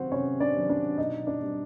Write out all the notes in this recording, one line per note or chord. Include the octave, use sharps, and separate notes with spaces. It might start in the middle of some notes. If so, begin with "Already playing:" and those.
Already playing: C3 D#3 F#3 C4 F#4 C5 F#5
C3 C#4 C#5
D4 D5
D#3 F#3
D4 D5
B2 D#4 D#5
D4 D5
G3 C4